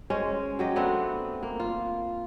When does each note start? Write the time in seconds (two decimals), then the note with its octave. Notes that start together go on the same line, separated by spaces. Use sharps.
0.10 G#3 C#4 C5
0.59 F#3 G4 D#5
0.76 A3 B3 C4 D4
1.43 A#3
1.60 F4